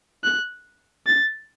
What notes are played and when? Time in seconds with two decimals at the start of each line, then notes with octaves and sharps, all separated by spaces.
0.24 F#6
1.07 A6